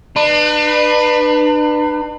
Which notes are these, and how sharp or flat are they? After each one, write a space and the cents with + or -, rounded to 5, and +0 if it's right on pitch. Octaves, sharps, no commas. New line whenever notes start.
D4 +40 B4 +0